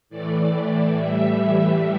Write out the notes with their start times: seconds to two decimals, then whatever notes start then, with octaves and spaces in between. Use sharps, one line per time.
0.09 A2 E3 A3 D5
0.96 A2 E3 G3 E5